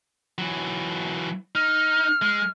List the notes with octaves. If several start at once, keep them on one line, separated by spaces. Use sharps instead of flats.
E3 F#3
D#4 F6
G#3